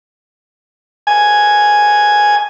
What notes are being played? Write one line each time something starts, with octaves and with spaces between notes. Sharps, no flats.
G#5